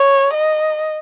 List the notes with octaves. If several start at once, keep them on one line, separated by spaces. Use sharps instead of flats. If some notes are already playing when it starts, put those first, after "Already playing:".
Already playing: C#5
D#5